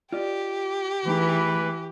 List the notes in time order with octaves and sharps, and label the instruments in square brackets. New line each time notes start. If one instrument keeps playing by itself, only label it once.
[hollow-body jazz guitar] F4 D5 D#5 [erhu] G4
[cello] E3 [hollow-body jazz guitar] A3 D#4 G#4 [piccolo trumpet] B4